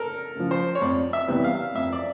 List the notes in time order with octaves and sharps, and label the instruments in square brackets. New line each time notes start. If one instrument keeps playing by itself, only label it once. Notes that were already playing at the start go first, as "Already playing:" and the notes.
Already playing: [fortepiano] A4 A#4
[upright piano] C#3 F3
[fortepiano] C5
C#5
[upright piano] F2 [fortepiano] D5
[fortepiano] E5
[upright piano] C3 E3 G3 B3
[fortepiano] F5
[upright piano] F2 [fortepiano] E5
[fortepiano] D5